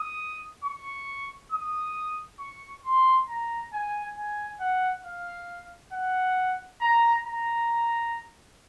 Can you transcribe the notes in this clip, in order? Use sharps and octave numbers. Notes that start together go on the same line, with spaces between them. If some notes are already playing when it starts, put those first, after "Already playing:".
Already playing: D#6
C#6
D#6
C#6
C6
A#5
G#5
G#5
F#5
F5
F#5
A#5
A#5